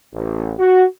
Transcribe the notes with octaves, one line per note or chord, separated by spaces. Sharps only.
A1
F#4